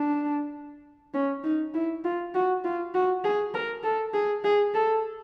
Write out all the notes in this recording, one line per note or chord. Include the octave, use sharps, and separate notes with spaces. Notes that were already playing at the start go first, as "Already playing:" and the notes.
Already playing: D4
C#4
D#4
E4
F4
F#4
F4
F#4
G#4
A#4
A4
G#4
G#4
A4